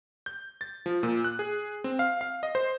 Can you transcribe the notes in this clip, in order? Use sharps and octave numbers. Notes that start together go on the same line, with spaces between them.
G6
A6
F3
A#2
F#6
G#4
C4
F5
F5
D#5
C5